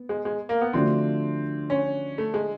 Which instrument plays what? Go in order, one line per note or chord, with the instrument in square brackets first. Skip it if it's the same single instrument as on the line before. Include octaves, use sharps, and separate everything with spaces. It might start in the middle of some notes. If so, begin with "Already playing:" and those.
Already playing: [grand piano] B3
[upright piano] G#3
G#3
A#3
B3
[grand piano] D3 F3 A3 D4 F#4 [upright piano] C4
[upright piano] C#4
A3
G#3